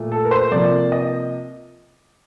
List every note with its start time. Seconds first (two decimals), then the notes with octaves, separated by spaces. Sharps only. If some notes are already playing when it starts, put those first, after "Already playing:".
Already playing: A#2 A3
0.12 A4
0.25 A#4
0.31 C5
0.51 C3 F3 A#3 D5
0.92 D#5